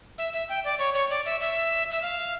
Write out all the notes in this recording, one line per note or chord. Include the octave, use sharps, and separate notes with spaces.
E5
E5
G5
D5
C#5
C#5
D5
E5
E5
E5
F5